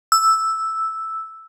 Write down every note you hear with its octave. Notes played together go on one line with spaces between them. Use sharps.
E6